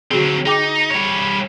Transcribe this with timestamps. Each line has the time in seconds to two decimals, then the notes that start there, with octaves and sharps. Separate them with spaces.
0.11 D3 F#3 C4 F#4 G#4
0.46 D#4 G#4 G5 D6
0.90 G3 C#5